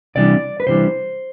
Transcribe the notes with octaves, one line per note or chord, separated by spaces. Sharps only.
C2 C3 E3 G3 D4 D5
B4
C2 C3 E3 G3 D4 C5